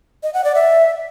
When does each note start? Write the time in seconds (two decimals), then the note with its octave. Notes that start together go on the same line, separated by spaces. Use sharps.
0.23 D#5
0.34 F#5
0.44 D5
0.55 E5